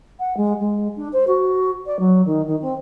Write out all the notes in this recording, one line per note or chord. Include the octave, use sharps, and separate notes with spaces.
F#5
G#3
G#3
D4
C5
F#4
D5
F#3
D#3
D#3
C4